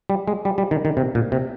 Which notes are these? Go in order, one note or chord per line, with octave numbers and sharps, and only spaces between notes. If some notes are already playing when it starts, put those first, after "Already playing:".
G3
G#3
G3
G3
D#3
D#3
C3
A#2
C3